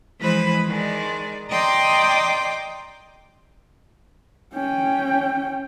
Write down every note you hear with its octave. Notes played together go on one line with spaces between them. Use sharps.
E3 F3 G#3 B4 C5 B5
D#3 G#3 D5
D5 D#5 G5 A#5 C6 D6
C#4 G5